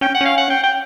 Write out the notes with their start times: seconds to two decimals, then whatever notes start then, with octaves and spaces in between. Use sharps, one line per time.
0.01 C#4 G5
0.15 F#5
0.21 C#4 F5
0.38 F#5
0.50 G5
0.63 G5